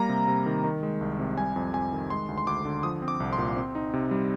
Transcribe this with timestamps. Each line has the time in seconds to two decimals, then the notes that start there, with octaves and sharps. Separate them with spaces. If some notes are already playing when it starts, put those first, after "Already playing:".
Already playing: G3 A#3 A#5
0.09 C3
0.28 C3
0.46 D#3
0.64 D#3
0.83 G#3
1.01 C2
1.20 C3
1.37 G3 G#5
1.56 F2
1.74 F2 G#5
1.92 D#3
2.10 G#3 C6
2.29 D2
2.38 C6
2.47 D2 D6
2.65 D3
2.83 F3 D#6
3.02 C4
3.08 D6
3.20 C2
3.33 C6
3.38 A#2
3.56 C4
3.75 D#4
3.93 C3
4.11 G3